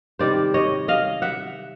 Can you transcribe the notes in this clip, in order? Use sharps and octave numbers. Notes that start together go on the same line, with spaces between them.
C3 D#3 G3 C5 D5
C#5 D#5
D#5 F5
E5 F#5